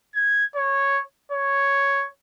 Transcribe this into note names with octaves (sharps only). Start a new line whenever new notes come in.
G#6
C#5
C#5